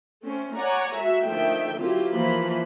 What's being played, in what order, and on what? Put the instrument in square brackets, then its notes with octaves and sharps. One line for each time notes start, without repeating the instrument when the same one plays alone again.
[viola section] A3 C4 C#4
C#5 D5 F#5 G#5 A#5
G#3 F#4 E5
D3 D#3 F3 A3 E5 G5
F#3 C4 E4 F4 G4
E3 F3 A#3 B5